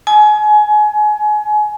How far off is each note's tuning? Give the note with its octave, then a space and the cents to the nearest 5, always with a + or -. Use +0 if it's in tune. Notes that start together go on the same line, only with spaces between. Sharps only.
G#5 +25